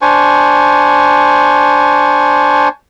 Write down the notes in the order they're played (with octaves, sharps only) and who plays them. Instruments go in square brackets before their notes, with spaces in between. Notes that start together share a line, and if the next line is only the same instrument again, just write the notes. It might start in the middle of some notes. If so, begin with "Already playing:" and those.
[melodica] D4 C5 G#5 C#6